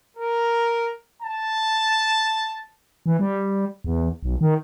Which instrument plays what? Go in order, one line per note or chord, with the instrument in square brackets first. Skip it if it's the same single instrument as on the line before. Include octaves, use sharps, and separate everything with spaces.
[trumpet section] A#4
A5
[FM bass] E3
G3
E2
B1
D#3